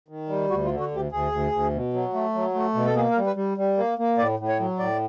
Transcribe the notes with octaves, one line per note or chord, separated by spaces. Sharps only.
D#3
G3
D2 F#4
F4
D3
F#4
D2 G4
D2 G#4
D2
D2
B2
F#3
A3
F#3
A3
B2
A4
A#3 G#4
A#4
G3
B4
G3
G3
A#3
A#3
A2 D5
A2
C#5
F#3
A2 D5